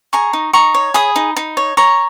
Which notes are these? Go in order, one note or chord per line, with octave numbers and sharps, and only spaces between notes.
G#4 A#5 C#6
D#4
D#4 A#5 C#6
C#5
G#4 B5 D#6
D#4
D#4
C#5
C#5 A#5 C#6